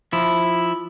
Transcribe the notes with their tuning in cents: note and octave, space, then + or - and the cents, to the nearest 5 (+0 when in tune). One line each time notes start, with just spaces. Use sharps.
F3 +0 E4 +0